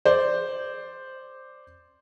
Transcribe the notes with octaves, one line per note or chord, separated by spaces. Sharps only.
C5 D5